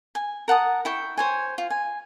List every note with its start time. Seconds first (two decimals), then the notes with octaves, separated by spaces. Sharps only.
0.15 G#5
0.48 A#4 F#5 A5 D#6
0.85 E4 G5 C#6
1.17 C5 C#5 G#5
1.58 F4
1.70 G#5